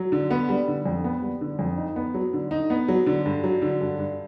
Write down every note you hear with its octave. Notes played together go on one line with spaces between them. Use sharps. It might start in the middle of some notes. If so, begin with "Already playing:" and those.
Already playing: F#3
D3
B3
G3
D3
F2
B3
G3
D3
F2
D#4
B3
F#3
D3
D#4
B3
F#3
D3
G2
F#3
D3
G2
G2